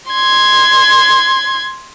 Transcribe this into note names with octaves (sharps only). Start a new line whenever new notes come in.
C6 G#6